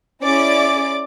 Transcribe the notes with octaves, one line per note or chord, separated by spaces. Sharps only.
C#4 E4 G#4 D5 D6